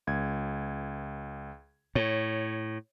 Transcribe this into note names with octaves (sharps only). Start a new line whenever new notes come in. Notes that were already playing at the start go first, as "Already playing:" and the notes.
C#2 G#6
A2 C#5